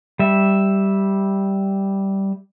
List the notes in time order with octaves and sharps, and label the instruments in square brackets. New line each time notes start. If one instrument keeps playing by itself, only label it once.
[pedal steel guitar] G3 E5